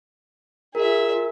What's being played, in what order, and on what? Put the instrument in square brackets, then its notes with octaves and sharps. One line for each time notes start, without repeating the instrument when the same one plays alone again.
[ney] F4 [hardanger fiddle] G#4 E5 [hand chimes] A#4